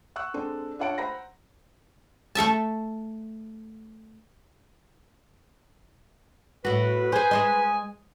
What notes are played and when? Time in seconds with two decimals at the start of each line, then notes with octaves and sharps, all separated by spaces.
0.16 F#5 C#6 E6 F#6
0.34 G#3 C4 D4 A4
0.79 D4 F4 C#5 F#5 A5 D7
0.98 C5 F#5 A#5 B5 A#6
2.35 A3 A4 E5 A5
6.65 A2 F#4 B4
7.12 G#4 C5 G#5
7.31 G#3 C5 D#5